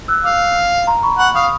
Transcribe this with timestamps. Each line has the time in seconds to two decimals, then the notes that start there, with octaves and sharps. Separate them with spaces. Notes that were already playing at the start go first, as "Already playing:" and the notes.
0.08 E6 F#6
0.24 F5 D6 E6
0.87 A#5 C6
1.03 B5 C#6
1.18 F#5 B5 C#6
1.35 F5 C#6 D#6